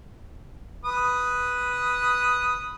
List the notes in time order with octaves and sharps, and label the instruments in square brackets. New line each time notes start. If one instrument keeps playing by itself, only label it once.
[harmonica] B4 D#6